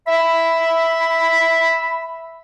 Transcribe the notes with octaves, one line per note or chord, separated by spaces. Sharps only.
E5 B5